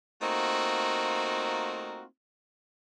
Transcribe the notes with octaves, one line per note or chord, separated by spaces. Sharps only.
A3 A#3 C4 D#4 F4 F#4